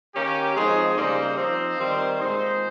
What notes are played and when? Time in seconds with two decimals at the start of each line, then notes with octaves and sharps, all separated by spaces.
0.14 D#3 A#3 C#4 G4
0.55 F3 G#3 C4 D#4 G#4
0.96 C#3 G3 A#3 D#4 C5
1.37 F3 C4 D#4 C5
1.79 D#3 G3 C4
2.20 A#2 G#3 C4 D#4 C5